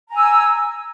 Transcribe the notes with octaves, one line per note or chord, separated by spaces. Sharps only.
G#5 A#5 E6